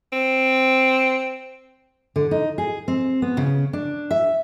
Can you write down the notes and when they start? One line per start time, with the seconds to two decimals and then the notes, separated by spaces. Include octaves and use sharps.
0.12 C4
2.16 D3
2.31 D#4
2.58 G#4
2.88 C4
3.22 B3
3.37 C#3
3.73 D4
4.11 E5